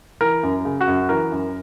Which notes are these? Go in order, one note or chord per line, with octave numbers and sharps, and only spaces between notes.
E3 A#4
F#2
C#3
F#4
F#2
E3 A#4
F#2